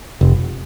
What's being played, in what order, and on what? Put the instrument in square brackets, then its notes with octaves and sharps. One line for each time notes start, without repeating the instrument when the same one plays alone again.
[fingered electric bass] F1